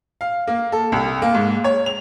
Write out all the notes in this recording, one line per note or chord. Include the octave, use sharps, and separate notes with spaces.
F5
A#3
A4
C2
A#3
G#2
C#5
F7